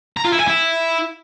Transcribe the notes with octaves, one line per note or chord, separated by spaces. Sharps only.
A#5
F4
E4
G#5
E4